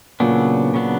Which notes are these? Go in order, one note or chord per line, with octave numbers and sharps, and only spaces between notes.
A#2 C#3 F#3 B3 D4
C#3 F#3 B3 D4